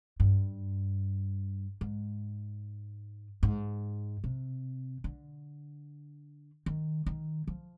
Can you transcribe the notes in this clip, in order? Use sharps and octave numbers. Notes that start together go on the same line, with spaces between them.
G2
G#2
G#2
C3
D3
D#3
D#3
F3